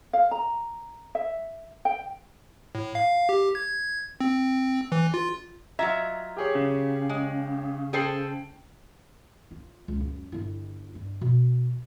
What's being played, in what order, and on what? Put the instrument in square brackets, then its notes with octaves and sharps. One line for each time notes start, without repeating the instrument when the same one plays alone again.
[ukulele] F5
A#5
E5
G5
[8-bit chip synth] A2
F5
G4
G#6
C4
E3
F4
[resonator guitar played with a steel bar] F#3 F4 E5 [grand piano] D#5 A#5 G#6
[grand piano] G4 G#4 C#5
[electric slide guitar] C#3
[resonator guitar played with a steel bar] G#3
[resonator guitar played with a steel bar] G#4 A4 C5 [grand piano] G5 C7 F#7
[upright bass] F4
C#2
F#2
G1 E4
G2
B2